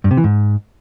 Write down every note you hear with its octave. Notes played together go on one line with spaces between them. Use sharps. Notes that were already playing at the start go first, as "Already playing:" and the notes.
G2
C3
E3
G#2